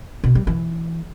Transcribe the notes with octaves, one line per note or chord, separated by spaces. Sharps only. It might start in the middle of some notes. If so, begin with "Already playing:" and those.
B2
G3
E3